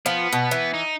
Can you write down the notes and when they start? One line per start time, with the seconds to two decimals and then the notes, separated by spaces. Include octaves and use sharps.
0.06 F3 B3
0.33 B2
0.51 E3
0.74 D#4